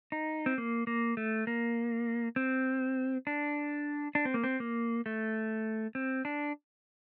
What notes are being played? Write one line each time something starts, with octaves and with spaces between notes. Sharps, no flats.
D#4
C4
A#3
A#3
A3
A#3
C4
D4
D4
C4
A#3
C4
A#3
A3
C4
D4